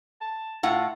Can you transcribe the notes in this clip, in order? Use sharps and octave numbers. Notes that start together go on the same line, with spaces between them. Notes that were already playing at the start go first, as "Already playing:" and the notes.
A5
A2 F4 F#5